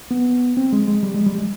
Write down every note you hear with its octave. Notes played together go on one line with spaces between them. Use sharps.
B3
C4
G#3
G#3
G3
G#3
G3
G#3